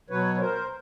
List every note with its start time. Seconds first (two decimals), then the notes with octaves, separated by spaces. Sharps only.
0.10 B2 F#3 B4 C#5
0.34 B4
0.40 A#4 C5